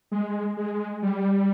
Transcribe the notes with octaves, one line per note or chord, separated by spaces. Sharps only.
G#3
G#3
G3